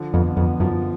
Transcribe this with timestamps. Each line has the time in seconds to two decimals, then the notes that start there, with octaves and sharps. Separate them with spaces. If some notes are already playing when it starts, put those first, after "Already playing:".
Already playing: D3 F3
0.14 F2 B3
0.37 F2 B3
0.60 F#2 F3